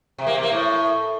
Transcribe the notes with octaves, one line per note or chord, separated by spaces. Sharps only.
C3
A#3
C3
A#3
A2